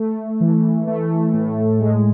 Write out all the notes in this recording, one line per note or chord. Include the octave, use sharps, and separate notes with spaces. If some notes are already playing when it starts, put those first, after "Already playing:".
Already playing: A3
E3
A3
A2
G#3